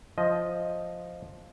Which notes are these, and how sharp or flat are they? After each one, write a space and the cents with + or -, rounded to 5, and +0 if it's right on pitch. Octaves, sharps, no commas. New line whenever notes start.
F3 +0 D#5 +0